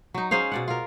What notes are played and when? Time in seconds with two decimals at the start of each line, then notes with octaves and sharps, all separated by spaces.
0.14 F#3 D#4
0.31 C#4 G#4 C5 F5
0.52 B2 D5 F#5
0.68 F4 A#4